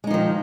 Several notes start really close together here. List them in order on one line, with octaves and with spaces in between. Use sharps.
G#3 D#4 F3 D#3